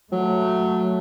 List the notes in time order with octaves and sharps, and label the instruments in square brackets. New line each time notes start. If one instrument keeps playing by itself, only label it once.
[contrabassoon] F#3 [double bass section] A3